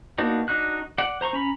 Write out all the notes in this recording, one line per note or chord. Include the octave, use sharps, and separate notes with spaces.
A#3 B3 D4 D#4 F#4
D4 D#4 F#4 F#6
D5 F#5
C5 A#5 C6 C#6
C#4 A#5 B5